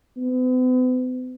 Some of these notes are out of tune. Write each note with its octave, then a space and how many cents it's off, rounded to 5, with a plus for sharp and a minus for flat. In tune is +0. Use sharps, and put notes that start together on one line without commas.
B3 +45